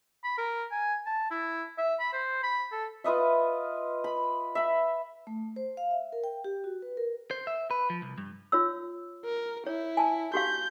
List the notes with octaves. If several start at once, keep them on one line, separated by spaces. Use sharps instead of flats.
B5
A#4
G#5
A5
E4
E5
B5
C5
B5
A4
F4 B4 D#5 E5
B5
E5 B5
A3
C5
F5
E5
A#4
G5
G4
F#4
B4
A#4
C5
E5
B4
F3
C2
G2
F4 C#5 E6
A#4
E4 C#5
G#5 A5
F#4 G4 F5 G6